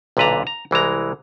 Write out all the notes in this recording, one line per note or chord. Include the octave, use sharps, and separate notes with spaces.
B1 A#2 D3 B4 A5 A#5
A#5
C2 E3 G#3 A#5